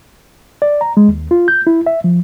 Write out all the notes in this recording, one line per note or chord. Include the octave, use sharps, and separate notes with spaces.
D5
A#5
G#3
D#2
F4
G6
E4
E5
F3